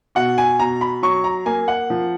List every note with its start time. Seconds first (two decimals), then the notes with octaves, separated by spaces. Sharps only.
0.15 B2 F#5
0.38 G#5
0.59 B2 A#5
0.81 B5
1.02 F#3 C#6
1.24 A#5
1.46 A#3 G#5
1.68 F#5
1.90 F3